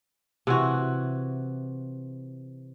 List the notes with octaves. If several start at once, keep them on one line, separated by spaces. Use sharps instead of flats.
C3 E3 F#4